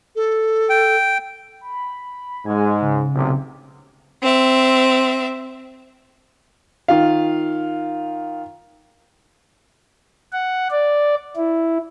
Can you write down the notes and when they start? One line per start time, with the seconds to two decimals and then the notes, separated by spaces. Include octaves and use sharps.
0.16 A4
0.70 G5
1.61 B5
2.46 G#2 G#3 G#5
2.81 C#3
3.14 B1 A2 C3
4.22 C4 E5
6.88 D#3 F4 F5
10.32 F#5
10.71 D5
11.36 E4